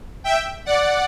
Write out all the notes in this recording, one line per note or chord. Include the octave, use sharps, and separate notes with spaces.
E5 G5
D5 F#5